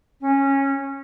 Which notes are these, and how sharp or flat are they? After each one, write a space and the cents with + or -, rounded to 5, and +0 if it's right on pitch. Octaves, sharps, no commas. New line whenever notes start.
C#4 -15